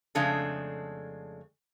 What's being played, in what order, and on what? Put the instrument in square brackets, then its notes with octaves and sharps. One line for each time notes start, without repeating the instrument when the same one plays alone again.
[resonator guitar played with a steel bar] F2 C#3 G#3 A3 D4